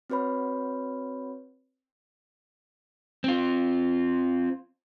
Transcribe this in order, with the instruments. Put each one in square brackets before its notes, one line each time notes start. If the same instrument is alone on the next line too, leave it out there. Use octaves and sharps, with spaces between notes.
[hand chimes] C4 F#4 B4 C#5 B5
[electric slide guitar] C4 F4